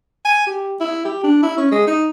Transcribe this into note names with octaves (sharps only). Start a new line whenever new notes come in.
G#5
G4
E4
G4
D4
E4
C#4
G#3
D#4